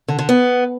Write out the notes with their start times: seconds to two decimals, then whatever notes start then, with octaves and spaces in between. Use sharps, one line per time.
0.08 D3
0.19 D3
0.29 B3